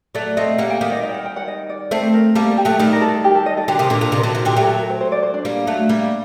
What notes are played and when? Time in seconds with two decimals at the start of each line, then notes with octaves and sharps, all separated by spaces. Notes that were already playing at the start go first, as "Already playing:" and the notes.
0.15 F#3 A3 D5
0.37 A3 C4 D#5
0.58 G3 A#3 F#5
0.70 G5
0.81 D#3 G3 F#5
0.92 D#5
1.03 D#5
1.09 G5
1.14 F#5
1.25 G5
1.36 F#5
1.48 D#5
1.69 D5
1.91 A3 C4 C5
2.14 A#4
2.35 G3 A#3 A4
2.58 G4
2.65 F#3 A3
2.80 D#3 G3 D#4
2.93 A#4
3.01 A4
3.24 G4
3.35 A4
3.46 D#5
3.57 A4
3.68 D3 F#3 G4
3.79 C3 D#3
3.90 A#2 D3 D4
4.01 A#2 D3
4.12 C3 D#3
4.19 A#4
4.23 D3 F#3 A4
4.34 C3 D#3 F#4
4.45 A#2 D3 G4
4.57 F#3 A3 G4
4.63 A#4
4.68 A4
4.79 A#4
4.90 C5
5.01 C5
5.12 D5
5.23 C5
5.34 D4
5.45 G3 A#3
5.67 F#3 A3
5.89 G3 A#3